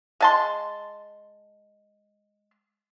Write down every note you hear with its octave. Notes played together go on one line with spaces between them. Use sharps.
G#3 A5 C6